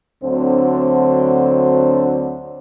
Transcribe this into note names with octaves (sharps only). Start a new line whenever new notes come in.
D2 D3 F#3 C4 D4 C5